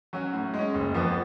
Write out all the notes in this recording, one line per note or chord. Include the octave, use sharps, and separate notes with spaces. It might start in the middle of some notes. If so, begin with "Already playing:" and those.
F#3 C#4 F#4
A2
G#3
C#4
F#1
F2 F3 B3